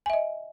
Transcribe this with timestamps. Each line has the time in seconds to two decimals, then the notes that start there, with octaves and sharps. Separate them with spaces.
0.06 G#5
0.10 E5
0.13 D#5